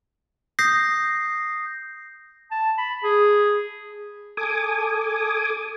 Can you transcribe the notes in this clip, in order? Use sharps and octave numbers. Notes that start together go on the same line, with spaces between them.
D#6 G6 A#6 C7
A5
B5
G#4
A4 G#5 D6 D#6